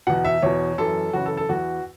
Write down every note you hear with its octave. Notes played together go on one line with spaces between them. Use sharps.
E2 B2 F#5
E5
E2 B2 C#5
F#2 E3 A4
F#2 C#3 E3 F#4
A4
A4
E2 E3 F#4